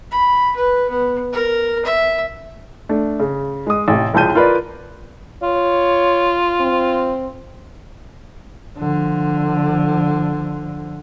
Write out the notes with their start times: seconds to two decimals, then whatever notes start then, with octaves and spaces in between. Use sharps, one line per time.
0.11 B5
0.56 B4
0.89 B3
1.32 A#4
1.85 E5
2.89 A3 D4
3.20 C#3
3.66 G#3 D#6
3.88 A1 C3
4.13 E1 C2 F4 A5 G6 D#7
4.35 F4 A#4 B4 D5
5.43 F4 C#5
6.60 C4
8.78 D3 F3